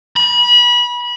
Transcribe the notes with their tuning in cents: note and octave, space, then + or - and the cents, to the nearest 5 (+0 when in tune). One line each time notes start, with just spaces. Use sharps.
B5 -30